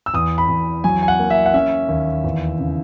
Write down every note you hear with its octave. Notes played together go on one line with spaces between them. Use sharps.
E6
E2 D#6
B5
E2
F#3 G#5
G#5
F#5
A#3
E5
F#5
C#4 E5
D#2
E2
C#3